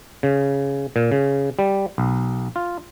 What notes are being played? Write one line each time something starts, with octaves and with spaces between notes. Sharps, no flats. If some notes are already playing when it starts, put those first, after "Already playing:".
C#3
A#2
C#3
G3
B1
F4